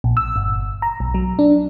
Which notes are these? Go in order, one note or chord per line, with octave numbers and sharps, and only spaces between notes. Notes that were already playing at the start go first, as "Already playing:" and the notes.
A#1
E6
G1
A#5
B1
F#3
D4